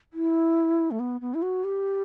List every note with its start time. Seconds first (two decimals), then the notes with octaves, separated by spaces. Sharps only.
0.13 E4
0.91 A3
1.00 B3
1.21 B3
1.34 E4
1.42 F#4
1.64 G4